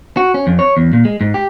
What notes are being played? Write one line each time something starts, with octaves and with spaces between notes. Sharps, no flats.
F#4
C#4
F2
C#5
E2
A#2
G#3
G#2
G4